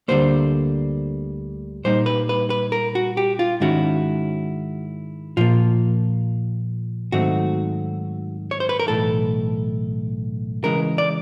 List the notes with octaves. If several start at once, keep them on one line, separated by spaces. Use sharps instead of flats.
D2 D3 G3 A#3 C5
A#2 G3 A#3 D#4 C5
B4
B4
B4
A#4
F#4
G4
F4
G#2 D#3 G#3 C#4 E4 F#4
A#2 F3 A#3 F4
G#2 D#3 F#3 A3 C4 F#4
C#5
C5
B4
A#4
B1 A2 E3 A4
C#3 E3 G#3 A#4
D5